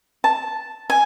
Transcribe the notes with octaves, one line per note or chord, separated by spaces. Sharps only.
A5
G#5